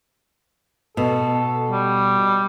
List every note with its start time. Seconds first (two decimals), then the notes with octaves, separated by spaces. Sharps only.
0.97 B2 A4
1.71 G3